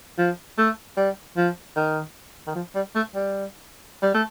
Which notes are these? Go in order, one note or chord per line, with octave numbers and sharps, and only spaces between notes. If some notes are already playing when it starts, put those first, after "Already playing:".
F3
A3
G3
F3
D#3
D#3
F3
G3
A3
G3
G3
A3